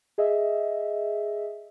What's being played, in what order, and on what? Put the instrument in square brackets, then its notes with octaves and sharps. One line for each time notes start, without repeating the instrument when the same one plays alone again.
[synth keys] G#4 D#5 E5